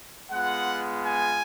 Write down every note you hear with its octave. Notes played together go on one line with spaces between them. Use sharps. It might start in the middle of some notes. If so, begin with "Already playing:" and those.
G#3 B3 F4 F#5
G#5